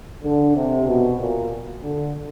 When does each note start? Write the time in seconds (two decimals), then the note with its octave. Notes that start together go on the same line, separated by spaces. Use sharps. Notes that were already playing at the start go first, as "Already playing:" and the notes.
0.24 D3
0.56 C3
0.87 B2
1.20 A#2
1.83 D3